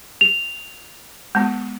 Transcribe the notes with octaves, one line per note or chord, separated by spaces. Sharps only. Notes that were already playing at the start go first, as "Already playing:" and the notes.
F7
G#3 B3